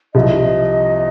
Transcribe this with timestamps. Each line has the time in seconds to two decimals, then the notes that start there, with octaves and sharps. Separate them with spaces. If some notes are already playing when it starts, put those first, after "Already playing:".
0.14 C2 C3 F3 D#5